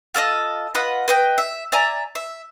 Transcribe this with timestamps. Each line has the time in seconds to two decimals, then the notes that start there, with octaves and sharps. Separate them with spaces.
0.14 F4 A4 D5 D#5
0.75 F4 B4 D#5 F#5
1.08 B4 D#5 G5
1.38 E5
1.72 D5 E5 G#5 A#5
2.15 E5